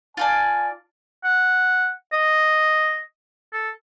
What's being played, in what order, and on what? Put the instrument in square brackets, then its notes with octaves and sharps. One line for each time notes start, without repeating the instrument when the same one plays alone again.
[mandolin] F4 D5 A5 [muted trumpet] G#5
[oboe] F#5
D#5
A4